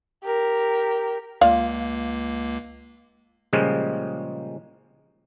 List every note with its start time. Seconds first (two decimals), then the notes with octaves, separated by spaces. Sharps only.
0.23 G4 A#4
1.41 C#2 A#3 F4 D5 F5
3.53 A#2 C#3 F3 G3 G#3